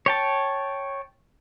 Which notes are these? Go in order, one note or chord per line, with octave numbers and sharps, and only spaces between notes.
C#5 G5 A5